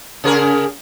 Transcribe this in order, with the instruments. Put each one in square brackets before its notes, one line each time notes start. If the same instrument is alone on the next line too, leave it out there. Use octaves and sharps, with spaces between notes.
[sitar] C#3 G#4 A#4